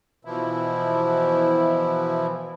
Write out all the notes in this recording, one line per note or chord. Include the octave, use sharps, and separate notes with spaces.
B2 E3 F3 E4